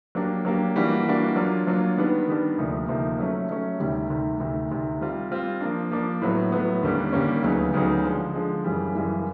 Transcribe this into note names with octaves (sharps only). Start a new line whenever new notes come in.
F#3 A#3 D4 G4
F#3 A#3 D4 G4
E3 G3 A#3 D4 F#4
E3 G3 A#3 D4 F#4
F#3 A#3 D4 F4
F#3 A#3 D4 F4
D#3 G3 B3 D4
D#3 G3 B3 D4
D2 C3 F3 A#3 D#4
D2 C3 F3 A#3 D#4
F#3 A3 C#4
F#3 A3 C#4
D2 C3 D#3 G3
D2 C3 D#3 G3
D2 C3 D#3
D2 C3 D#3
G3 C4 F4
G3 C4 F4
F3 A#3 D4
F3 A#3 D4
A2 F#3 B3
A2 F#3 B3
D#2 D3 G3 A#3 C#4
D#2 D3 G3 A#3 C#4
D2 C#3 F#3 B3 D#4
D2 C#3 F#3 B3 D#4
D3 F3 G#3
D3 F3 G#3
F#2 C#3 E3 G3
F#2 C#3 E3 G3